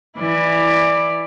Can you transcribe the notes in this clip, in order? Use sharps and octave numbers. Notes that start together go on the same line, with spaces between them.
E3 E4 D5